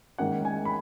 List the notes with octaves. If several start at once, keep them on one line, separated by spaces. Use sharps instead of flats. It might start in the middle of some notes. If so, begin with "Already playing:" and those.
G#2 D#3 A#3 C#4 F#5
G#5
B5